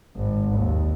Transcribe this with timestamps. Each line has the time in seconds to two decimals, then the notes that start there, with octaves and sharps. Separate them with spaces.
0.16 G#1
0.54 D#2